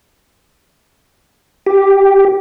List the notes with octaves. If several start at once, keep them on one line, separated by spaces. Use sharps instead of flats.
G4